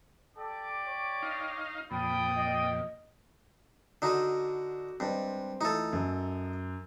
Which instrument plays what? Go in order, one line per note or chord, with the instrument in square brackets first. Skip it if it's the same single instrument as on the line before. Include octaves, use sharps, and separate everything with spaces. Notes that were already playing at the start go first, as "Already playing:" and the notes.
[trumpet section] G4 D5 D6 [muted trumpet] A4
[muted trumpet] C#5
[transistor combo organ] D#4 F5
[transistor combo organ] F2 A#2 [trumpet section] D5 G5 D#6 [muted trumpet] B5
[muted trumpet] D#5
[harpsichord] D3 D#4 [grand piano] F#4
[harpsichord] G2 [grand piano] G#3 C4
[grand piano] E3 A3 F4 [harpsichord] D#4 A4
[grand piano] F#2